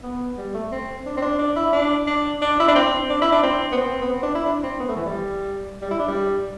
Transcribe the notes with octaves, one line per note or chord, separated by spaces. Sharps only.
B3
G3
A3
C4
D4
C4
D4
D4
E4
D4
D4
D4
E4
D4
C4
D4
E4
D4
C4
B3
C4
B3
C4
D4
E4
D4
C4
B3
A3
E3
G3
G3
E4
D4
G3